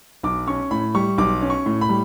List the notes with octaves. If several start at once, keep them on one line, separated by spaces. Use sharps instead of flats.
B1 D6
C#4 C#6
A2 B5
G3 C#6
B1 D6
C#4
C#6
A2
B5
G3